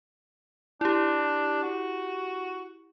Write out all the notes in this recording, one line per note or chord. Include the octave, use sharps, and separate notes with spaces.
D4 E4 G4
F#4